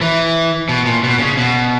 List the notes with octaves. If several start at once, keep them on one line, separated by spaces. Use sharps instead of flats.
E3
B2
A#2
B2
C#3
B2